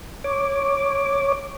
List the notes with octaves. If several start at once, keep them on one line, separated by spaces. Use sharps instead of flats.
C#5 D6